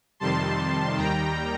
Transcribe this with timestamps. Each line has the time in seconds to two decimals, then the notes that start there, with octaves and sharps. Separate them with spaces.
0.20 F2 C3 D#3 G3 A5 C6
0.96 D#2 D#3 G3 G5 A#5